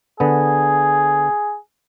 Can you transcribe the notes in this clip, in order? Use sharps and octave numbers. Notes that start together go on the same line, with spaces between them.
D3 B3 G#4